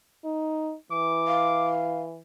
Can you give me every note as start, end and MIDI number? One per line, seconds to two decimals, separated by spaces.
0.25 0.74 63
0.92 2.20 52
0.92 1.71 86
1.27 2.00 77